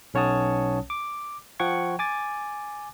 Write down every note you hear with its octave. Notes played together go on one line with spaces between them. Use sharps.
B1 C#4 C#5 F#5 A5 D#6
D6
F3 F#5 G5 C#6 G#6
G#5 D6 A6